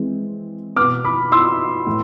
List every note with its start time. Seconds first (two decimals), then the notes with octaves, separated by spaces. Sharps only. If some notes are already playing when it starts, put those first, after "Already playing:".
Already playing: E3 G#3 C4
0.76 B2 B3 D6 F6
1.05 B5 D6
1.32 C6 E6
1.87 A2 E3